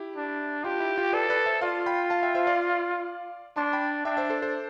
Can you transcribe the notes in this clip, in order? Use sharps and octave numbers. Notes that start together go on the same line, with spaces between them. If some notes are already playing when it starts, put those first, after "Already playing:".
Already playing: E4 G4
D4
F4 G4
E4
F4
A4 B4 D5
B4 D5
C5 E5
F4 D5 F5
G5 B5
F5 A5
E5 G5
C5 E5
D5 F5
D4 A5 C6
G5 B5
D4 E5 G5
C5 E5
A4 C5
A4 C5